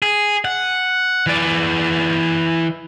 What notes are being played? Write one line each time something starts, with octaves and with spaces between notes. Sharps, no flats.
G#4
F#5
E3 D5